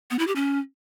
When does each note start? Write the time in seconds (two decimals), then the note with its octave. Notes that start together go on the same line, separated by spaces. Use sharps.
0.11 B3
0.19 E4
0.27 G4
0.36 C#4